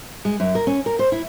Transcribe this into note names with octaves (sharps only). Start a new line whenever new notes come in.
G#3
F#2
A#4
C#4
A#4
C5
E4